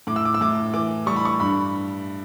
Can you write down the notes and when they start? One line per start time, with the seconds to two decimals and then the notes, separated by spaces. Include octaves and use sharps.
0.07 A2 D6
0.16 E6
0.25 D6
0.34 E6
0.41 A2 D6
0.74 E3 D6
1.06 G3 C#6
1.16 B5
1.25 C#6
1.40 G2 B5